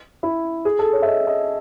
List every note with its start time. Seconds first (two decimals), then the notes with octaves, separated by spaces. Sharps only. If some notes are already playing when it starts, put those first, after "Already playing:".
0.23 E4
0.65 G#4
0.79 A4
0.93 C#5
1.02 E5
1.07 D#5
1.27 D#5